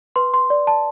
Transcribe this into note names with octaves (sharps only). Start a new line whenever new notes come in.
B4 C6
C6
D5
A5